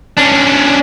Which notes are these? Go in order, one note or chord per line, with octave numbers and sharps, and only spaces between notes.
C#4 D4